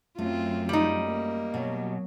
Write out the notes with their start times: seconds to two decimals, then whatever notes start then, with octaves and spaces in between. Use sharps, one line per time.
0.18 F#2 A3 C4 F4
0.69 G3 D#4
1.02 A#3
1.54 B2 F#3